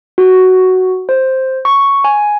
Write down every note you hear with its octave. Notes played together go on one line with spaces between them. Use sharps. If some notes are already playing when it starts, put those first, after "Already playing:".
F#4
C5
C#6
G#5